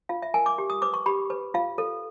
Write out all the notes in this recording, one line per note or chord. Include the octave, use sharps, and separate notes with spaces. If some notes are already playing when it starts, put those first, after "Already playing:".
F4 F5
E5
A#4 G#5
D6
G4
D#6
B4 D6
C#6
G4 B5
B4
F4 F5
A4